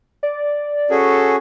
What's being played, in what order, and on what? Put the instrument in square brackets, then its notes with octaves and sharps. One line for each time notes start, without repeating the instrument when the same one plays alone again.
[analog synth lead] D5
[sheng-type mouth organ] C#4 F#4 G#4 [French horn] A4